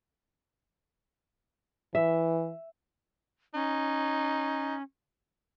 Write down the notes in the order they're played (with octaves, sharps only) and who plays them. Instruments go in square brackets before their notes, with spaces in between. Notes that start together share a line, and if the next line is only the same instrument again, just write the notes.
[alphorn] E3 [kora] E5
[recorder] C#4 [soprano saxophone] D#4